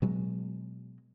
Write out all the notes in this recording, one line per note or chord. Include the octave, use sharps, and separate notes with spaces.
B2 F#3 G#3